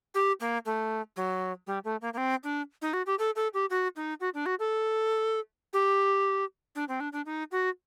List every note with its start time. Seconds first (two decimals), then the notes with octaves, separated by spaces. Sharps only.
0.14 G4
0.40 A#3
0.66 A3
1.16 F#3
1.67 G3
1.84 A3
2.01 A#3
2.14 A#3
2.18 C4
2.44 D4
2.82 D#4
2.93 F#4
3.06 G4
3.19 A4
3.36 A4
3.54 G4
3.70 F#4
3.96 D#4
4.21 F#4
4.34 D4
4.46 F#4
4.59 A4
5.73 G4
6.75 D4
6.88 C4
7.00 D4
7.13 D4
7.26 D#4
7.52 F#4